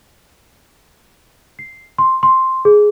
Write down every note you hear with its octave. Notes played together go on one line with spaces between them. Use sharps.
C7
C6
C6
G#4